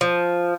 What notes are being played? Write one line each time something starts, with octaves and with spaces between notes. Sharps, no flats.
F3